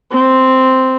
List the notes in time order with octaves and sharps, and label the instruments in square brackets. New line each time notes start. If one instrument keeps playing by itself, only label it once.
[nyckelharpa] C4